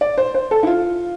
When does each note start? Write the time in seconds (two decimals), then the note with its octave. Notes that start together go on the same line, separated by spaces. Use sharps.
0.01 D5
0.18 C5
0.34 C5
0.51 A4
0.63 E4
0.67 F4